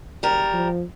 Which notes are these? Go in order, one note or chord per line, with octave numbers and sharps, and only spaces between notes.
F#1 G3 A#4
F3